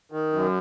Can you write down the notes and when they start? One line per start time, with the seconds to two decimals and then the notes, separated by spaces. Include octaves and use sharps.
0.12 D#3
0.33 F#2